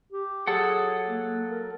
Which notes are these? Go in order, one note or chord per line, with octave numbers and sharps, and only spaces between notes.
G4
F#3 G#4 A4 F#5
A#3
A#4